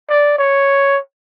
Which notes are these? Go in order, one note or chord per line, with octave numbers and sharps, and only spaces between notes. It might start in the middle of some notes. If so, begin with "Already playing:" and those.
D5
C#5